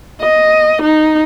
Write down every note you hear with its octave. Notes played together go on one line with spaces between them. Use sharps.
D#5
D#4